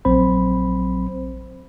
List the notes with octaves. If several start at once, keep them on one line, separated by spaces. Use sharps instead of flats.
A#1 F#3 C4 C5 B5